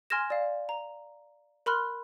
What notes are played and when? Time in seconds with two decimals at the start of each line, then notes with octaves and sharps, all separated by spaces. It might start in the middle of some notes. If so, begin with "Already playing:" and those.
0.10 G#5 C6 F6 G#6 A#6 E7
0.30 D5 F5
0.69 A#5
1.66 A#4 B5 C6 F6 F#6